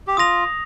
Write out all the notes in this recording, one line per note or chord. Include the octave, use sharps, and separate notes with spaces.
G4
F4 D#6 A#6 F7